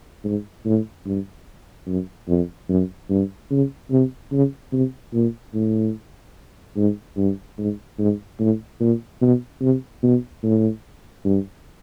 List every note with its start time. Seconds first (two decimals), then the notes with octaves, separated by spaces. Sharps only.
0.24 G#2
0.65 A2
1.06 G2
1.87 F#2
2.28 F2
2.69 F#2
3.10 G2
3.51 C#3
3.91 C3
4.32 C#3
4.72 C3
5.14 A#2
5.54 A2
6.76 G#2
7.17 G2
7.58 G#2
7.99 G#2
8.40 A2
8.80 A#2
9.21 B2
9.62 C3
10.03 B2
10.43 A2
11.25 G2